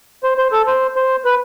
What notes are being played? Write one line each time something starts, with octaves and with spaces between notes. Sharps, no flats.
C5
C5
A4
C5
C5
B4